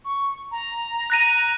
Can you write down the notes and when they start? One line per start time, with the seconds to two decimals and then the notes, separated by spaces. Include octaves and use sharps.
0.05 C#6
0.51 A#5
1.10 F#6 A#6 D#7